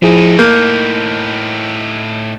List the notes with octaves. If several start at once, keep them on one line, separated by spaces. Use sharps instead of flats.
A2 F3 D#4 E4 G#4
A#3 G6